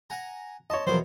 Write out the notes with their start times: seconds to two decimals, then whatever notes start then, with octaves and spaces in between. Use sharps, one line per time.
0.10 F#5 G#5 A#5
0.70 C#5 D#5 A5 C6
0.87 E2 B2 F3 F#3 A#4 C5 D5